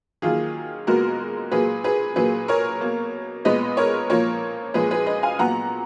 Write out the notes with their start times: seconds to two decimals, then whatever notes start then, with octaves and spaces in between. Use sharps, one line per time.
0.22 D#3 F#3 A#3 F4 G#4
0.87 A#2 G#3 B3 F#4 A#4
1.51 A#2 F#3 A#3 G#4 B4
1.84 G#4 B4
2.16 A#2 F#3 A#3 G#4 B4
2.48 A#4 C#5
2.81 B2 A#3
3.45 A#2 G#3 B3 B4 D#5
3.77 A#4 C#5
4.10 A#2 F3 A#3 A#4 C#5
4.74 A#2 F3 G#3 G#4 B4
4.91 G#4 B4
5.06 B4 D#5
5.23 F5 G#5
5.39 A#2 F#3 B3 F#5 A#5